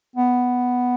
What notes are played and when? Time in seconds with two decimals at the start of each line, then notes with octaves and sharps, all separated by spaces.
0.16 B3